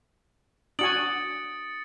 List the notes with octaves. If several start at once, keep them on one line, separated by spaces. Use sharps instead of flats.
D4 F#4 G#5 D#6 A6 C#7 D7 F#7